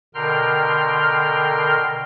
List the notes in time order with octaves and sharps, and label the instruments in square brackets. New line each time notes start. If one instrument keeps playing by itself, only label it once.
[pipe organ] B2 D3 A#4 G5 C6 F6